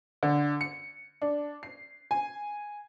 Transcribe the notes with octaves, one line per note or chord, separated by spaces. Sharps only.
D3
C#7
D4
C7
G#5